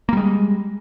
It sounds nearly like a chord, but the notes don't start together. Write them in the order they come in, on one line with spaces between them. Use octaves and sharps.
A#3 G3 G#3